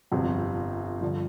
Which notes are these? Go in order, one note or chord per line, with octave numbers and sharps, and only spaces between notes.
G1 F2 C3 F3 C4
G2 D3 F3